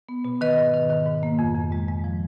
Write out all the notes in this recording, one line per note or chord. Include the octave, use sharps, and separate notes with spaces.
B3
B2
D#3 B4 D#5
G#2
D#3
D#3
G#2
A#3
F2
F2
G#3
G#3
F3